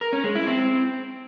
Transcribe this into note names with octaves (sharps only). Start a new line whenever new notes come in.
A#4
C#4
G#3
E4
C4